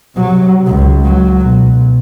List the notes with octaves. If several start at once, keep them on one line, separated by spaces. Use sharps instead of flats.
C3 F#3
C#2
F#3
B1